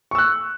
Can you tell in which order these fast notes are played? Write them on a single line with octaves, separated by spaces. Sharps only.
C#6 E6 F#6